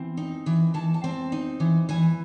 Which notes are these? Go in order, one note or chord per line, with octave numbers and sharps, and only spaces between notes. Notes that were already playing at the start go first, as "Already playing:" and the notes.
Already playing: E3 C4
D#4
E3
E3 A5
A5
C4
D#4
E3
E3 G#5